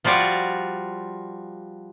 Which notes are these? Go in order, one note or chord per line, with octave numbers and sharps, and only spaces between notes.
F3 G3 F4 F#4 D5